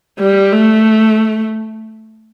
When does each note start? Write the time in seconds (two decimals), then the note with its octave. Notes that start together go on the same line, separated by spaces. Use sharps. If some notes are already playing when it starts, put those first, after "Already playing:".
0.20 G3
0.53 A3